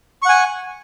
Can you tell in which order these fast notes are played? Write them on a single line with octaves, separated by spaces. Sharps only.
C#6 F#5 G#5